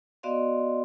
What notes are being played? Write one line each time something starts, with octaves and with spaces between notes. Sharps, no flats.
B3 F#4 D5 D#5 F5 C6